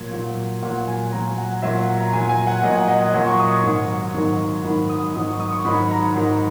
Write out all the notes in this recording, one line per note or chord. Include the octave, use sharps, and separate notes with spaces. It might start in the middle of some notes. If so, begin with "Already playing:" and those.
Already playing: A#2 F#3
A#2 F#3
A#2 F#3 F#5
G#5
A#2 F#3 A#5
F#5
A#2 F#3 E5
F#5
A#5
A#2 F#3 G#5
G#5
F#5
A#2 F#3 D#5
F#5
D#5
F#5
A#2 F#3
C#6
D#6
C#6
G#2 D#3 F#3
G#2 D#3 F#3
G#2 D#3 F#3 B5
D#6
G#2 D#3 F#3 D#6
C#6
D#6
C#6
G#2 D#3 F#3 B5
A#5
G#2 D#3 F#3